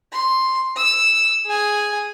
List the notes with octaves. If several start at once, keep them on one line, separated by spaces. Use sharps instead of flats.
C6
E6
G#4 G#5